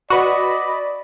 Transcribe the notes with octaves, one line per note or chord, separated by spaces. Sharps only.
F#4 B4 D5 D#5 B5